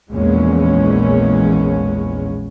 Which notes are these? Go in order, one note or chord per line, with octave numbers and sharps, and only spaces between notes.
A#1 E2 A#2 G#3 C#4